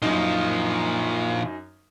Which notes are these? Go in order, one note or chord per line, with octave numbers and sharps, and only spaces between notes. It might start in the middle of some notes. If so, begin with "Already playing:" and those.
F#2 A#2 F3 D#4